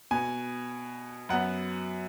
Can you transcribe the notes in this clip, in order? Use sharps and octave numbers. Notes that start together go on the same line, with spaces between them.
B2 B3 G#5
F#2 F#3 B3 F#5